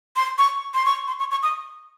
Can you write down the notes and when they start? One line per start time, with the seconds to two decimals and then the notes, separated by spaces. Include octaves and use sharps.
0.16 C6
0.38 C#6
0.74 C6
0.86 C#6
1.08 C6
1.19 C#6
1.31 C#6
1.43 D#6